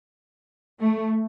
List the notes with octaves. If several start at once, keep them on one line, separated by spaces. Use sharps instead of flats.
A3